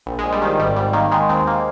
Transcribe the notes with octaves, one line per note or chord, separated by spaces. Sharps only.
A#1
G#3
A#1
G3
D#3 F3
G#1 G3
G#1 G3
D#3 A#3
D#3 G#3
D#2 C4
A#3